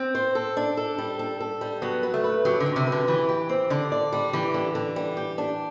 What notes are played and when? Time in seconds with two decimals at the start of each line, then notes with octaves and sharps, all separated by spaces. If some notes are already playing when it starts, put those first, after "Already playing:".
Already playing: C4
0.15 C5
0.35 A4
0.57 D4
0.77 A4
0.98 G3
1.19 A4
1.40 A4
1.61 G3
1.82 F#3 B3
2.03 B4
2.14 A3
2.24 B4
2.45 F#3 G4
2.60 D3
2.66 F#3
2.76 C3
2.87 B4
2.92 D3
3.07 E3 G4
3.29 G4
3.49 C4
3.70 D3 D5
3.92 D5
4.13 G3
4.33 E3 G4
4.54 D3
4.75 D3
4.96 G3
5.17 G4
5.38 D4